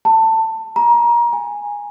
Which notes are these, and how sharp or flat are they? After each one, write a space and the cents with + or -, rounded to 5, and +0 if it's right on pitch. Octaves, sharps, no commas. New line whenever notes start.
A5 +20
A#5 +25
G#5 -10